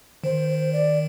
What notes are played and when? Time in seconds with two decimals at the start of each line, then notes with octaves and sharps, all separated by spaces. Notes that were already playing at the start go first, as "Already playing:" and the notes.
0.24 D#3 C5
0.49 C5
0.73 D5